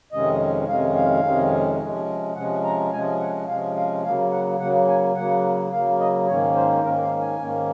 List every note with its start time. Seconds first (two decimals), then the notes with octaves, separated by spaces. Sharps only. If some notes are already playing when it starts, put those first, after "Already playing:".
0.12 F2 C3 D#3 G#3 C#4 D#5
0.68 F2 C3 D#3 G#3 C#4 F5
0.96 F5
1.24 F2 C3 D#3 G#3 C#4
1.80 C3 F3 G#3 C#4
2.35 C3 F3 G#3 C#4 F#5
2.63 A#5
2.92 C3 F3 G#3 C#4 G#5
3.20 F#5
3.47 C3 F3 G#3 C#4 F5
3.76 F5
4.03 C#3 F#3 A#3 F5
4.32 F#5
4.60 C#3 F#3 A#3 F#5
4.88 G#5
5.15 C#3 F#3 A#3 F#5
5.72 C#3 F#3 A#3 F5
5.99 D#5
6.28 G#2 D#3 A#3 C#4 C#5
6.56 C5
6.83 G#2 D#3 A#3 C#4 A#4
7.02 F5
7.21 G#5
7.40 G#2 D#3 A#3 C#4